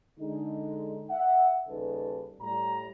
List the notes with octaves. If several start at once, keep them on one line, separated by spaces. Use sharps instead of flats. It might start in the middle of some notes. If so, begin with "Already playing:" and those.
D3 G#3 D#4
E5 F#5
D#2 C#3 G3 D#4 A4 B4
A2 G3 A#5